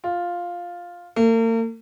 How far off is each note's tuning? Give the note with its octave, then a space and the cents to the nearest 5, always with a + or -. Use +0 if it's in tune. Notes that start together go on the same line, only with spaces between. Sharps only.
F4 +5
A#3 -45